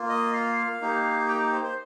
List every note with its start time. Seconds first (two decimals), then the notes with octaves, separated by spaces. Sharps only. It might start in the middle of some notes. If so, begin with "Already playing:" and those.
Already playing: A#3 F4
0.09 D#5
0.33 F5
0.81 A#3 D#4 G4
1.28 G5
1.53 C5
1.63 C5